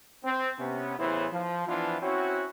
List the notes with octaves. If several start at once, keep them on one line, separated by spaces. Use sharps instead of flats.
C4
C3 B3 C#4
A1 C#3 E3 B3 E4 C5
F3
E3 F3 B3 D4 F4
C4 C#4 E4 F#4